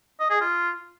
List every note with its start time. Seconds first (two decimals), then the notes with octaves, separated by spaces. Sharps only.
0.20 D#5
0.30 G#4
0.41 F4